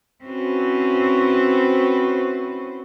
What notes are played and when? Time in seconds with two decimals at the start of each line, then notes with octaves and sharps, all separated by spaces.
0.25 C4 C#4 E4 F#4 B4 C5